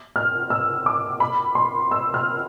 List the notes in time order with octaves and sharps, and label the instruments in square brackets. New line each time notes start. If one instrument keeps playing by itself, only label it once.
[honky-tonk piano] F6
E6
D6
B5
C6
E6
F6